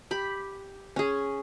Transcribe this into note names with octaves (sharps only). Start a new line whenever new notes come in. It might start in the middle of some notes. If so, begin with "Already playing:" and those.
G4 B5
C#4 G#4